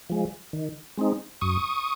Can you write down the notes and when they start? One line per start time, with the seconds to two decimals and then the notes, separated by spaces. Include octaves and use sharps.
0.10 F3 G#3
0.53 D#3
0.97 G#3 C4 D#4
1.41 F#2 C#6 D#6